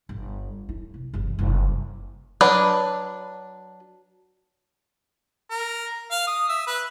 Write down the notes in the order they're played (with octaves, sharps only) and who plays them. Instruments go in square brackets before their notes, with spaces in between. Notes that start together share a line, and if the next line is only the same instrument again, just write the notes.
[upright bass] G1
E4
C2
G1 E2
F#1 C2
[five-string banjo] F#3 D4 B4
[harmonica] A#4
F5
D#6
E5
B4